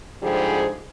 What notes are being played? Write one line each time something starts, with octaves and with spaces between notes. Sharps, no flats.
G#2 D3 F3 G3 G4 G#4